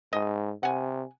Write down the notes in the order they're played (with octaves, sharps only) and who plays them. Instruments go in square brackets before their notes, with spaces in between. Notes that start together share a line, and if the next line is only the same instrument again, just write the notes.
[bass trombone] G#2 [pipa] D#5
[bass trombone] C3 [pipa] F#5 G#5